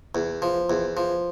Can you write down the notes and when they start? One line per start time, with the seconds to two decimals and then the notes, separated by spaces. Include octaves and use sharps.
0.15 E2
0.42 F3
0.70 E2
0.97 F3